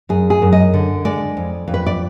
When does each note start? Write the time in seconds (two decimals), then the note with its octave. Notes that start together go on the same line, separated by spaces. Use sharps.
0.09 F#2 G#4
0.30 G#4
0.42 F#2
0.52 D#5
0.74 D3
1.05 G#3 D5
1.37 F2
1.68 F2
1.74 B4
1.86 D5